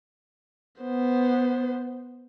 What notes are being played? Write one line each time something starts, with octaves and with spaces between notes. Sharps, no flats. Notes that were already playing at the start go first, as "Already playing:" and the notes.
B3 C5